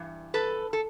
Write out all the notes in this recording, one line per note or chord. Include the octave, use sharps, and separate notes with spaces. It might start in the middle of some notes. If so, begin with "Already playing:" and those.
Already playing: G2 E3
A4 B4
A4